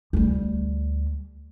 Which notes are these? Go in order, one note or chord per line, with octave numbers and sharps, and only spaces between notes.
D2 G3